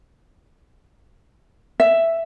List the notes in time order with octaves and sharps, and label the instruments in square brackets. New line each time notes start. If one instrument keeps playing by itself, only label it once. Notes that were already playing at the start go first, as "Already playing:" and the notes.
[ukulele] E5